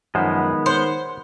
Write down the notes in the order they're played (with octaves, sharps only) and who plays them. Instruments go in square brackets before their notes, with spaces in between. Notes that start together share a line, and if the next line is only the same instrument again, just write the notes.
[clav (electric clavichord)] F#2 F3 C5 [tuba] D#3 [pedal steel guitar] G#3 B3
[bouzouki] C5 [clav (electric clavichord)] C#5 F#5